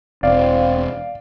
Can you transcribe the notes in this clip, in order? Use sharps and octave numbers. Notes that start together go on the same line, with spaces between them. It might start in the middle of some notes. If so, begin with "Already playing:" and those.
E1 C4 D5 F5